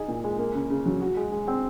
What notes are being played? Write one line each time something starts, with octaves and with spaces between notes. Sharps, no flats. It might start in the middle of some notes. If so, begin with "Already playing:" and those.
Already playing: D#4 G#4
A#2
G#3
A#3
C#3
C#3
F#3
F#4
G#3
G#3
C4